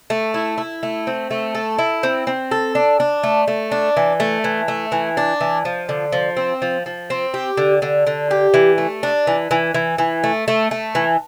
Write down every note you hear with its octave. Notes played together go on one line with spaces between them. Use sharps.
A3
E4
E4
A3
C4
A3
A4
E4
C4
C4
A4
D4
D4
A3
A3
D4
E3
A3
E3
A3
E3
D4
E3
F3
D3
F3
C4
F3
F3
C4
G4
D3
D3
D3
G4
E3
A3
D4
E3
E3
E3
E3
A3
A3
A3
E3